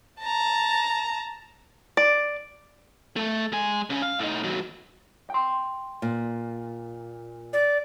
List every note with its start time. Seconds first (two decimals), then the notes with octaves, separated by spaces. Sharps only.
0.20 A5 A#5
1.97 D5
3.16 A3 A4
3.52 G#3 G#5
3.90 C#3 C#4
4.02 F5
4.19 A2 D#4
4.44 D#2 F#3
5.30 G5 C6
6.02 A#2
7.53 D5